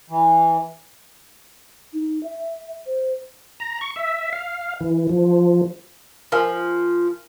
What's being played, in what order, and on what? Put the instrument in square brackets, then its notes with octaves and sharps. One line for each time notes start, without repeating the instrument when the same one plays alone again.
[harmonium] E3
[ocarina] D#4
E5
C5
[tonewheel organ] A#5
C#6
E5
F5
E3
F3
[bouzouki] F3 [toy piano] A#4 F5 G#5